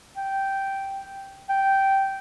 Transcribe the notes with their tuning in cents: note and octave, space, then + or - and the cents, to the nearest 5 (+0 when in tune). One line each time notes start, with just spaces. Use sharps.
G5 -5
G5 -10